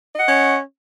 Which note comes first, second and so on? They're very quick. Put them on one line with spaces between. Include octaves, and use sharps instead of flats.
D#5 F#5 C#4 C#5